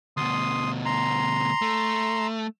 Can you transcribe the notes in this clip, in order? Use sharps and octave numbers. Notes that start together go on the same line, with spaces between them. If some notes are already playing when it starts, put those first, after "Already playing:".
D2 B2 C6 D#6
A#5 C6
A3